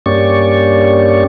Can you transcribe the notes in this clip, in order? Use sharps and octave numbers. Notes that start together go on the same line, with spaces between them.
G2 A#3 C#4 G4 D5 C#6